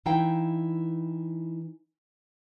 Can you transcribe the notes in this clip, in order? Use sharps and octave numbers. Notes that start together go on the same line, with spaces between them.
E3 D#4 E4 F5 G5